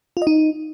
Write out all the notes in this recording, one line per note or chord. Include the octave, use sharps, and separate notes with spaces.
F4
D#5
D#4